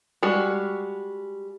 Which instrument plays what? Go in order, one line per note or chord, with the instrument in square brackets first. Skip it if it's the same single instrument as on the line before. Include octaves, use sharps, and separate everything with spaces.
[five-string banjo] G3 G#3 F#4